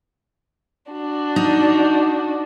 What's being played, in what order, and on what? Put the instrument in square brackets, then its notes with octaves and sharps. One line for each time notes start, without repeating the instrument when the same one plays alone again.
[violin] D4 F#4
[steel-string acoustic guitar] D#4